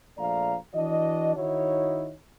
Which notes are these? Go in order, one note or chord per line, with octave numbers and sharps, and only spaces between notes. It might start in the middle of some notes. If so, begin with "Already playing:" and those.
A#1 F3 A3 D5 F5 A#5
E3 D4 F#4 D#5
D#3 D#4 E4 F#4 C#5